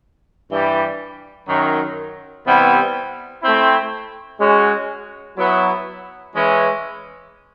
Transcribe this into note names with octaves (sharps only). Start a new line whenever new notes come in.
G2 E3 G3
F#2 D#3 F#3
C3 E3 G3 B3 E4
A3 C4 E4
G#3 C#4 F#4
F#3 B3 E4
E3 G#3 C#4